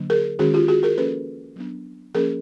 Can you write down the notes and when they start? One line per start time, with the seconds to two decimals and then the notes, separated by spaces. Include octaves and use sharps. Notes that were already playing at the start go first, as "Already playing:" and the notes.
Already playing: D3 F#3 A#3 D4
0.10 G#4 A#4
0.39 D#3 G#3 C#4 F#4 G#4
0.54 F4 G4
0.68 F#4 G#4
0.83 G#4 A#4
0.98 F3 A#3 C#4 A4 B4
1.56 F#3 B3 D4
2.14 F3 A#3 C#4 G#4 A#4